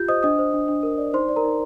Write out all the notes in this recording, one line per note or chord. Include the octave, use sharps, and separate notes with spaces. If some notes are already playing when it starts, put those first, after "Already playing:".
Already playing: F4 G4 G6
C5 D#5 D#6
D4 D#5 D#6
C5
D4
D4
A#4
D5
D#4 C5 C6
D5
A#4 A#5
D#4